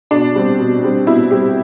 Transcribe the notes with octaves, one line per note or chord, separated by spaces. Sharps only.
B2 D4
G3 C4
B2
G3 C4
B2 E4
G3 C4 G4